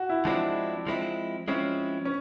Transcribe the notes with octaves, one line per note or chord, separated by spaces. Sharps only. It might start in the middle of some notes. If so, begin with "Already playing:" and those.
Already playing: F#4
E4
F3 G#3 C4 D4 E4
F3 G#3 C4 E4
F3 G#3 C4 C#4 E4
C#4